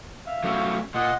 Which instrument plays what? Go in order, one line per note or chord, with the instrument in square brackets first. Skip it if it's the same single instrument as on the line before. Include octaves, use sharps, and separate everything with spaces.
[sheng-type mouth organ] E5 F5
[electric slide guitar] F#3 A3 C#4
[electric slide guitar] A#2 [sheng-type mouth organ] D#5 F#5 C6